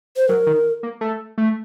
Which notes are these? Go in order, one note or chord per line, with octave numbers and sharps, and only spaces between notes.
C5
F#3 A#4
D#3
A#3
A3
A3